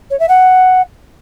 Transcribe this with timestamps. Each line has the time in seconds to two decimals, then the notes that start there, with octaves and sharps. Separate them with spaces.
0.10 C#5
0.19 E5
0.28 F#5